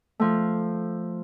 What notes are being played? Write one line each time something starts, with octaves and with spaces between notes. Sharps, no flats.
F3 A3